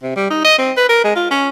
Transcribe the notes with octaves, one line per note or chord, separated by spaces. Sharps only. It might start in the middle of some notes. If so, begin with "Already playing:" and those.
C3
G3
D#4
D#5
C4
B4
A#4
G#3
F4
C#4